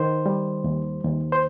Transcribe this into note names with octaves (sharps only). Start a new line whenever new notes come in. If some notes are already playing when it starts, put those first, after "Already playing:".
Already playing: D#3 C5
G3
D#2
D#2
C5